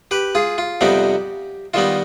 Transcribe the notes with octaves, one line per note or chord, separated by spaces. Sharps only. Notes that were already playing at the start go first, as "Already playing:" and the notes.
G4 B4
F4 G#4
F4
F2 C3 G3 B3 D#4 G4
D#3 G3 B3 D#4 F4